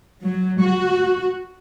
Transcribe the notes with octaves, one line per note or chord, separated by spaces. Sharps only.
F#3
F#4